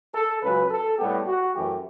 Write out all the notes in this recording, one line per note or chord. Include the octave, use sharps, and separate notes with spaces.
A4
C#2 C#3 F#3 B4
A4
A2 G3 B3 G4
F#4
F#2 E3 A3 G4